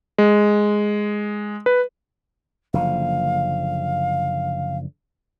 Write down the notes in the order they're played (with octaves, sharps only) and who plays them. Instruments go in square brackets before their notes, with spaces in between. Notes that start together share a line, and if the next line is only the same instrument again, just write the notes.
[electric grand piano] G#3
B4
[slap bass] F#1 D3 F3 [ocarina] F5